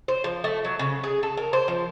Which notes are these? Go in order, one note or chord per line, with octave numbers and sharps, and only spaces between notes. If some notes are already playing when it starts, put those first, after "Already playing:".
C5
F3
A3
F#3
C#3
G#4
A4
A#4
C5
F3